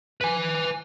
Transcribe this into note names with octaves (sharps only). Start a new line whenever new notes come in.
B4 G#5